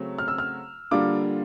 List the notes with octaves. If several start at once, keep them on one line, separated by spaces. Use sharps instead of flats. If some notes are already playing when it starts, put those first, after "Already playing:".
Already playing: C#3 F#3 A3 C4
F6
E6
F6
D3 G3 A#3 D4 F4 D6